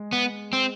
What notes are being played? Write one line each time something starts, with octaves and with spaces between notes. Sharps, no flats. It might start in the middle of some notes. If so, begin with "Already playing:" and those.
Already playing: G#3
B3
C4